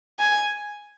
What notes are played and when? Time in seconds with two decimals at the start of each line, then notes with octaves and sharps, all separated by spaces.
0.20 G#5